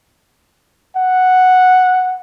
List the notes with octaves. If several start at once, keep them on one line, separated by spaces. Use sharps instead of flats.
F#5